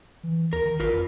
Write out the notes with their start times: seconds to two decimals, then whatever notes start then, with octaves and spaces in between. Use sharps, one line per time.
0.23 E3
0.53 D#2 A#4
0.65 D#3
0.80 A1 F4 A#4 B4
0.94 F2